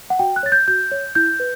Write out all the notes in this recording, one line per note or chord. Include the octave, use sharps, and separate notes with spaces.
F#5
F#4 G5
F#6
C#5 A6
G6
F#4 G6
C#5
E4 G6
B4